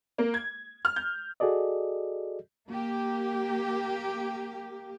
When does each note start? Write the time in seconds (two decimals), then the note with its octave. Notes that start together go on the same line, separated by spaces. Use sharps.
0.18 A#3
0.34 G#6
0.85 F6
0.96 G6
1.40 F#4 G#4 A4 D5 D#5
2.69 A#3 G4